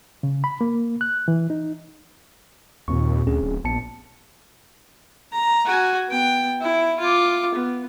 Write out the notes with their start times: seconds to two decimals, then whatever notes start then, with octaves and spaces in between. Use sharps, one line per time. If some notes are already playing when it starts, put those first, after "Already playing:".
0.23 C#3
0.44 B5
0.61 A#3
1.01 F#6
1.28 E3
1.50 D#4
2.88 D#2 A#2 C4 C#6
3.27 D2 C4 C#4 G#4
3.41 D1
3.64 A#1 B3 A5 C#7
5.32 A#5
5.65 F#4 G#5
6.09 B3 G5
6.61 E4
6.99 F4 D6
7.54 B3